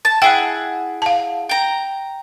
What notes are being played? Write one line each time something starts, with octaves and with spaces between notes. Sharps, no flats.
A5
E4 G#4 F#5 G5
F5 A5
G5 A#5